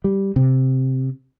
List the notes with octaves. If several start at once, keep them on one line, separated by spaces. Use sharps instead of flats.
G3
C3